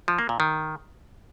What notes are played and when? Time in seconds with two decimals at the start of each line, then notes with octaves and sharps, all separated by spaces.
0.08 F3
0.19 A#3
0.29 A#2
0.40 D#3